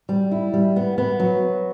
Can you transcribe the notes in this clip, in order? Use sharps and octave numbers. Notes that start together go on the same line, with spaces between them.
G3
E4
G3
B3
B3
F#3